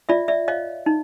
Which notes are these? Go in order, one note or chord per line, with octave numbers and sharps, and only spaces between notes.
F4 D5 E5
D5 E5
C#5 D#5 F5
D#4